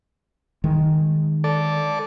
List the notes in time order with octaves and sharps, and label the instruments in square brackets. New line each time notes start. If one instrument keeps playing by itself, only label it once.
[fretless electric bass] D#3 G#3
[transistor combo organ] A4 D5